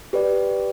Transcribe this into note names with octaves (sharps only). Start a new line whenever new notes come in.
G4 B4 D5